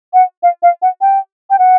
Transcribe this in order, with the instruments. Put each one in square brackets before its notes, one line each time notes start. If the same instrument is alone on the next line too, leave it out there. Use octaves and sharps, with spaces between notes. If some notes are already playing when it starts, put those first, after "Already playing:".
[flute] F#5
F5
F5
F#5
G5
G5
F#5